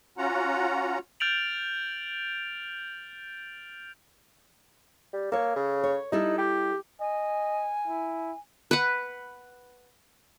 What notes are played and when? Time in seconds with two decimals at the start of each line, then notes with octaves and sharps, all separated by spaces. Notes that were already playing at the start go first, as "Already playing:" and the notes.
0.18 C#4 F4 F#4 F#5 A#5
1.20 F6 G6 A6 D7 F7 F#7
5.13 G3
5.32 A#3 A4 C#5
5.57 C#3
5.84 C#5
6.12 G3 D#4 E4 A4
6.38 G4
7.00 D#5 G#5
7.87 E4
8.71 B4 F#5